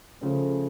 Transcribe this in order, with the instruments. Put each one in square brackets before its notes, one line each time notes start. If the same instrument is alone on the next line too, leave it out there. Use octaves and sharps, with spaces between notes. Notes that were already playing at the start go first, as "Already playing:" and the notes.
[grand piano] C#3 F3 A3 C#4